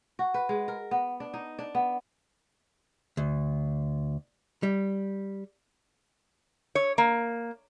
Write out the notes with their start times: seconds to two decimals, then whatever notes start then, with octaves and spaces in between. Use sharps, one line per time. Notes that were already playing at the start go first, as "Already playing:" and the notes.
0.19 F#4
0.34 B4
0.49 G#3
0.68 A#4
0.91 B3
1.20 D4
1.34 D#4
1.59 D4
1.75 B3
3.17 D2
4.63 G3
6.75 C#5
6.98 A#3